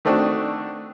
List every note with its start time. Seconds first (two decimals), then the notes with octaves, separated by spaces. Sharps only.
0.05 D#3 A3 C4 D4 F#4